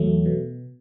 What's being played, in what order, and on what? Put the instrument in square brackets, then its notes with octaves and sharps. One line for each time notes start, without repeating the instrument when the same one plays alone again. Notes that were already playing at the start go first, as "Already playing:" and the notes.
Already playing: [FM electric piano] E2 F#3 A3
B2